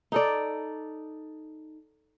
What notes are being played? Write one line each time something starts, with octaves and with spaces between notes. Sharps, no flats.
D#4 A4 D5